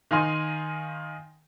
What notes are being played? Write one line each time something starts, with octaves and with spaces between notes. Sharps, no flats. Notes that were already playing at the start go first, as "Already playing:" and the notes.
D#3 D#4 F5 G#5 C6